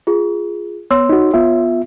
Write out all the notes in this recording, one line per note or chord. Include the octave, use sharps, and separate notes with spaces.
F4 G#4
B3 C#5 C6 E6
D#4 F#4
B3 F4 E5